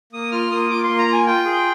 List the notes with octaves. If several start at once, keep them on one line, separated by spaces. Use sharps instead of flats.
A#3 D#6
F4 F6
A#3 D#6
F4 D6
C6
A#3
A#5
F4 G#5
F4 G5
G#4